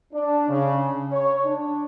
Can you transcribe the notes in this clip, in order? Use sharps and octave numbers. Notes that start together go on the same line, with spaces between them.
D4
C#3
C#5
D4